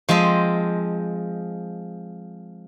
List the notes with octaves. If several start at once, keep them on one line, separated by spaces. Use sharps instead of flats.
F3 G#3 C4 D#5